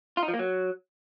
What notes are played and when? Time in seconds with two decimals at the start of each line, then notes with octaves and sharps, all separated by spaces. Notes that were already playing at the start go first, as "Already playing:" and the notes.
0.17 F4
0.23 D#4
0.28 F3
0.34 A#3
0.39 F#3